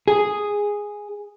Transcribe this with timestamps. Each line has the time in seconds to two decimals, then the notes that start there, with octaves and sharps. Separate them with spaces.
0.08 G#4